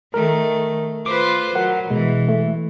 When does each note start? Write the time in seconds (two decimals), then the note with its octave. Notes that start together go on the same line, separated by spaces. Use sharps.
0.14 D#3 A3 A#4
1.06 F4 B4 C5 D6
1.55 F#3 A#4 F#5
1.90 B2 E3 G#3
2.29 A3